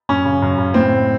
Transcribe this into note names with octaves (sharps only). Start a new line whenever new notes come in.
F#2 C#4
C#3
F#2
C#3
A2 C4